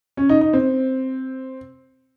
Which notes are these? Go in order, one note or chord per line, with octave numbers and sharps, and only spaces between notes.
C#4
D#4
D#4
C4